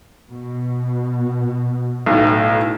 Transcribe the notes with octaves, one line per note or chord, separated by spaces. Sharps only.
B2
B1 A2